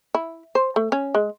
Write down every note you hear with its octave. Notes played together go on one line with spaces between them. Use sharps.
E4
C5
A3
C#4
G#3